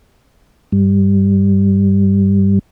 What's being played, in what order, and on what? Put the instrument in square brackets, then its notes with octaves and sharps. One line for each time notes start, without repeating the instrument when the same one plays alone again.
[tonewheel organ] G2 G3